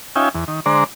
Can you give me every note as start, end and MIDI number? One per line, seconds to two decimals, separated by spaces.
0.16 0.29 61
0.16 0.29 63
0.16 0.29 65
0.16 0.29 76
0.16 0.29 79
0.16 0.29 80
0.34 0.45 40
0.48 0.60 51
0.66 0.84 50
0.66 0.84 56
0.66 0.84 72
0.66 0.84 74
0.66 0.84 82